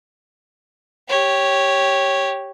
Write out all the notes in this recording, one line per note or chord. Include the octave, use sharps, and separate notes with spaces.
G4 C#5